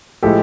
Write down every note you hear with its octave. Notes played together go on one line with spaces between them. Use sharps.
A2 F3 G#3 G4 A4